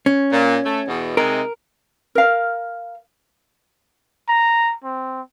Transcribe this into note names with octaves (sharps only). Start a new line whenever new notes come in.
C#4
A#2
A3
E2 B2
C3 G#3 D#4 A#4
A#4 F5
A#5
C4